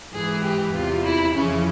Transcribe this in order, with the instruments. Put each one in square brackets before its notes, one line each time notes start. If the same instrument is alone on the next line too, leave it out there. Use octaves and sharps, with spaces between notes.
[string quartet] G#2 E3 G#4
G4
E2 C3 E3 F4
E4
F2 C#3 E3 C#4